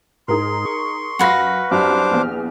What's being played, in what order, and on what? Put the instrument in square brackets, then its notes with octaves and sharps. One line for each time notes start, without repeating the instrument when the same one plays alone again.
[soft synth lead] G#2 [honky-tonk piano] D#4 G#4 A#4 [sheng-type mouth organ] C6
[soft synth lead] C#6
[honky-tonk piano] F#2 A#6 [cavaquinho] F#4 B4 F5
[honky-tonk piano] C2 F#2 [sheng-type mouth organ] D4 C5 D6 [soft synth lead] F6
[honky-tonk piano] A#1 E2